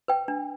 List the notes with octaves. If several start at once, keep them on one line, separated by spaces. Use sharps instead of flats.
B4 G5
D4